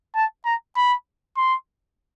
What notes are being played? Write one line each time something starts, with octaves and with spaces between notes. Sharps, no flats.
A5
A#5
B5
C6